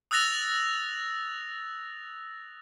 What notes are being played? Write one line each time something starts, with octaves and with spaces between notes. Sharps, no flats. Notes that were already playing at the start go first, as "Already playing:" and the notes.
D#6 E6 F#6 A6 A#6 F7